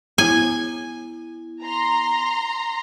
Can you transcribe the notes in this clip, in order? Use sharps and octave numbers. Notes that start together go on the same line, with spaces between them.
B3 E4 G#5
A#5 C6